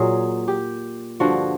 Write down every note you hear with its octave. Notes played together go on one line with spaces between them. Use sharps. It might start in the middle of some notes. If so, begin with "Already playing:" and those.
Already playing: A#2 F#3 G#4
G4
G2 D3 F3 F#4